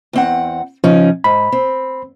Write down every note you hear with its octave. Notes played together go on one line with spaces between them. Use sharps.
E2 C4 F#5
C#3 F3 C#4 D#4
G#2 B5
C4